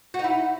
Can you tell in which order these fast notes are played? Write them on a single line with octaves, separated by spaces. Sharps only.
F#4 D#4 E4